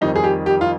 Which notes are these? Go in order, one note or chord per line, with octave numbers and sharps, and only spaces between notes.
F2 D#3 G3 D#4
G#4
G4
G4
F4